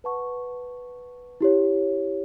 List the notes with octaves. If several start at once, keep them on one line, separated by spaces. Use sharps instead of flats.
B4 F#5 A5 C#6
E4 G4 C#5